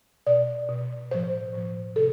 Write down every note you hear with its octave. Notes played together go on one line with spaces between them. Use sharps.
B2 D5
B2
A2 F3 C5
A2 F3
C3 A4